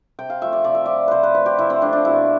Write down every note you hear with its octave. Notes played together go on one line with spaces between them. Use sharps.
C3 G5
F5
F3 A3 E5
D5
C3 D5
E5
F3 A3 D5
C3 B4 C5
B4
F3 A3 B4
G4
C3 E4
C4
F3 A3 D4
D4
B2 E4